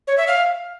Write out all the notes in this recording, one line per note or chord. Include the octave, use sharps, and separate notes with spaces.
C#5
E5
F5